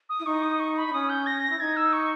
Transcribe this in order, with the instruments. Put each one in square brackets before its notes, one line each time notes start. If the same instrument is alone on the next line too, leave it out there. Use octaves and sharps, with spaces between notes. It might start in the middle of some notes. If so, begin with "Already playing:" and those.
[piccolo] D#6
[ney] E4
[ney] D#4 [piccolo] C#6
[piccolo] D#6
C#6
B5
[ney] D#4
[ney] C#4 [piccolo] D#6
[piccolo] G6
A#6
A#6
[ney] E4
[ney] D#4 [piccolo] G#6
[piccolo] E6
C#6